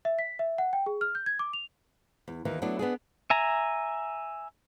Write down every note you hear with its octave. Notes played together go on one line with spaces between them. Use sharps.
E5
B6
E5
F#5
G5
G#4
F6
G6
G#6
D6
F7
E2
D#2 D#3 E3
F#3 A3 B3 D4 E4
B3 D4 G#4
E5 G#5 A#5